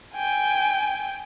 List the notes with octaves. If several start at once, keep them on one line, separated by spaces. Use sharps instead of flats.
G5 G#5